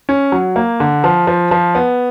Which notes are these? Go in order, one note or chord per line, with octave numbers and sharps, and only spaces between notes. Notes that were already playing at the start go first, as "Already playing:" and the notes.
C#4
F#3
A#3
D3
F3
F3
F3
B3